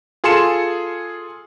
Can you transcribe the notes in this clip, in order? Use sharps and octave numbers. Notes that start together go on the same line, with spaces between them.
F4 G#4 A4 C6 C#7 E7